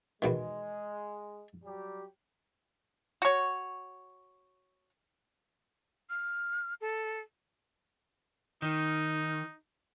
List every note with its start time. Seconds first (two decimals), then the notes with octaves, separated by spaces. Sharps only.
0.22 E2 B2 D#3 G#3
1.64 F#3 G3 G4
3.22 F#4 C#5
6.10 F6
6.81 A4
8.62 D#3 D#4